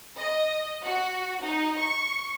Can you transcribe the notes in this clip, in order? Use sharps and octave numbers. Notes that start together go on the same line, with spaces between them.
D#5
F#4
D#4
C#6